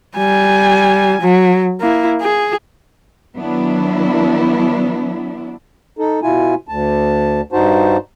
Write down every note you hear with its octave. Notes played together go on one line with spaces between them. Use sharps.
G3 G#5
F#3
A#3 E4
G#4
D#3 F#3 B3 D4 E4
D#4 A4
B2 E4 F4 G#5
D2 A5
G2 D#4 F#4 C5 A5